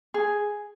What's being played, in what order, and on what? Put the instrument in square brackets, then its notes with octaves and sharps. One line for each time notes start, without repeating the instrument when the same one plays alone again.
[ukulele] G#4